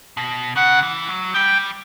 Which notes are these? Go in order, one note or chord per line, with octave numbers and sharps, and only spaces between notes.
B2
C#3 F#5
E3
F#3
G3 G5